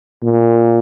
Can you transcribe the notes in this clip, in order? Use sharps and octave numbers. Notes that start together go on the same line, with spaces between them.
A#2